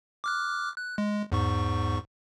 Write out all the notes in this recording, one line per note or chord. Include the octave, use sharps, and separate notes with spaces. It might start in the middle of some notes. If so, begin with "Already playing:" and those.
D6 F6 F#6
F#6
G#3
E2 G#2 C#6